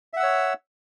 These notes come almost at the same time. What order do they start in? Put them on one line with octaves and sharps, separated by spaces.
E5 F#5 E6 C#5